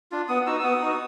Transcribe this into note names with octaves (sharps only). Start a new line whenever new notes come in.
D4 F4
B3 D#6
D#4 F#4 E6
E6
B3 D#6
D#4 F#4